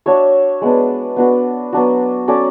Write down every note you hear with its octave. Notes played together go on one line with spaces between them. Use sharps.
D4 F#4 C#5 E5
G#3 B3 D4
B3 D4 F#4
F#3 B3 D4 F#4
C#4 F#4 A4 D5